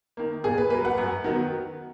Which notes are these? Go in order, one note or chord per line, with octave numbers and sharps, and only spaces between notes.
D#3 A#3
A#2 G#4
B4
F#3 A#3 B4
F#5
F#2
D#3 F#3 B3